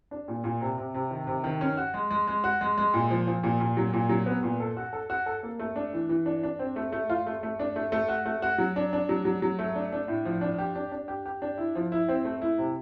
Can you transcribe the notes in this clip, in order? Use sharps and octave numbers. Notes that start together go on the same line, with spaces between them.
D4
A#2
A#2
C3
C3
C3
D#3
C3
D#3
C#4
F#4
G#3
G#3
G#3
F#4
G#3
G#3
A#2
F3
F3
A#2
A#2
F#3
A#2
F#3
B3
A#2
A4
F#4
A4
F#4
A4
A#3
A3
D4
E3
E3
D4
D4
C4
A3
A3
F4
A3
A3
D4
A3
A3
F#4
A3
F#4
F#3
D4
D4
F#3
F#3
F#3
A3
D4
D4
A2
F3
D4
G4
D4
D4
G4
G4
D4
E4
F3
E4
C4
A3
E4
C3